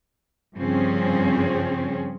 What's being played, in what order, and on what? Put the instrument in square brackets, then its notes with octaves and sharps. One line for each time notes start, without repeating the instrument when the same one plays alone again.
[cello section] G2 C#3 F3 C4 C#4 G#4